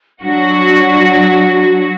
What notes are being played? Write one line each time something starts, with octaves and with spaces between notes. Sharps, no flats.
F#3 D4 F#4